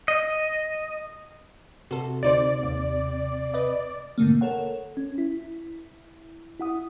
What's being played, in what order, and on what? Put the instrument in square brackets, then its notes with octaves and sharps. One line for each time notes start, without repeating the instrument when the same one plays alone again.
[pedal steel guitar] D#5
[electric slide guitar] C3 [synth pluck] F#4 A4
[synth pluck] D2 D#4 C5 [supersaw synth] D5
[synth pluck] D#2
B4 D#5
[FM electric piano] G#2 B2 D3 A3 A#3
A4 A#4 C#5 F#5
C#4
E4
E4 F#5 D#6